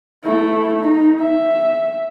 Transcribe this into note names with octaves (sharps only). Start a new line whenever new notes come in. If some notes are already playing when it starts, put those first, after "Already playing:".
A3 E4
D#4
E5